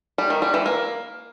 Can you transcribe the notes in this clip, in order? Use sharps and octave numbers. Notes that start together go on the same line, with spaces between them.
G3
D#3
G3
E3
A#3